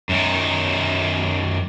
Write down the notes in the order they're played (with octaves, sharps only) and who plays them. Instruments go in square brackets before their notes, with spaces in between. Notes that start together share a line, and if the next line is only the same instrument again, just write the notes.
[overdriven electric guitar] F#2 D#3